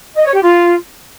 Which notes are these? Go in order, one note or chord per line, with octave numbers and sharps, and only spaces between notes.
D#5
C#5
G4
F4